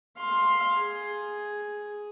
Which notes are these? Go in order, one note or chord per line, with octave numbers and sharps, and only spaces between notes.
F5 C6
G#4